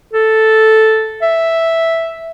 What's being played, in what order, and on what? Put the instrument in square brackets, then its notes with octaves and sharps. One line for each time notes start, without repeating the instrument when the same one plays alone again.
[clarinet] A4
E5